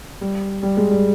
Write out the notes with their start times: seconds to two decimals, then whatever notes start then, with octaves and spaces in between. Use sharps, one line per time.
0.21 G3
0.63 G3
0.77 G#3
0.91 G3